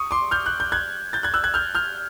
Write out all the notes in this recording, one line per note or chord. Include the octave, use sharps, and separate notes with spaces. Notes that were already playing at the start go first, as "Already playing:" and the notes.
Already playing: C#6 D#6
C6 D6
F6 G6
F#6
G6
F#6 G#6
G6 A6
F#6 G#6
E6 F#6
F#6 G#6
F6 G6
F6 G6